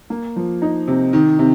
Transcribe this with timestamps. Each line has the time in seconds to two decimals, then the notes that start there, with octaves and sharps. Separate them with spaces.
0.10 A#3
0.36 F3
0.62 D#4
0.88 C3
1.13 D#3
1.39 C3